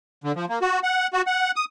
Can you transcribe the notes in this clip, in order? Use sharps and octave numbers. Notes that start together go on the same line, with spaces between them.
D3
F3
A#3
F#4
F#5
F#4
F#5
D#6